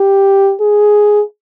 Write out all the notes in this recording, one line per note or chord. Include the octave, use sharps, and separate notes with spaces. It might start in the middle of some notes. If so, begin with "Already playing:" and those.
Already playing: G4
G#4